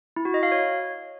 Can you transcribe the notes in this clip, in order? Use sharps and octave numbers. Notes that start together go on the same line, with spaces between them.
E4
F#4
D#5
F5
C#5